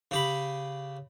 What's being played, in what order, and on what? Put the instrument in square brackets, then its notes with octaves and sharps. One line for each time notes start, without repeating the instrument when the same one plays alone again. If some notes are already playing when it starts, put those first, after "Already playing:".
[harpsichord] C#3 G4 B5